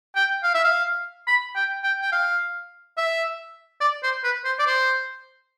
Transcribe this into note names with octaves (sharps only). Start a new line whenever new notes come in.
G5
F5
E5
F5
B5
G5
G5
G5
F5
E5
D5
C5
B4
C5
D5
C5